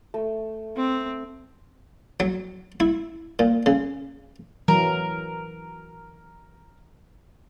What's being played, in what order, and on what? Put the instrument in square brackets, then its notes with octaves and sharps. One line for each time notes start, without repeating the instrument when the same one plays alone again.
[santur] A3
[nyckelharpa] C4
[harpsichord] F#3
E4
A#2
C#3
[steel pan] E3 F#3 [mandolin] A#4